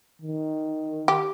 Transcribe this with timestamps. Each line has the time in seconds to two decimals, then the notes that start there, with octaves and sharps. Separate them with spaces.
0.22 D#3
1.08 G4